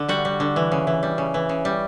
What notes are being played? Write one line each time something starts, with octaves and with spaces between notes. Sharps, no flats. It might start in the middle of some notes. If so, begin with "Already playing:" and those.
Already playing: D3
G3 F#4
G3
D3
E3
C#3
E3
G3
C#3
E3
C#3
G3